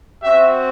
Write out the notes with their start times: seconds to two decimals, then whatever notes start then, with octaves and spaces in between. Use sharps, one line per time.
0.23 C4 F#4 E5